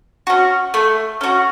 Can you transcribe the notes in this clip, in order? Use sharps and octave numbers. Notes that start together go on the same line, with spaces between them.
C#4 F#4
A3
C#4 F#4